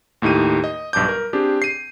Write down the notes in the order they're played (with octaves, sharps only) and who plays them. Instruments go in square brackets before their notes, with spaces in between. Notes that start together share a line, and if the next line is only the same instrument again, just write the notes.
[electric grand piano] D#2 A2 D#4 G4 D#7
D#5
B1 G2 A5 D6 G6
A#4
C4 D4 G4 G#4
C7 D#7